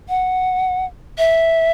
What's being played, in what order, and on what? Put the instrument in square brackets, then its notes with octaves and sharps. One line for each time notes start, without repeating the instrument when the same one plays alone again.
[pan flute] F#5
E5